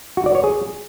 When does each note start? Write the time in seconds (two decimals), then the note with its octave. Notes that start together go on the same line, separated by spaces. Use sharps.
0.17 F#4
0.26 D5
0.35 C#5
0.44 G#4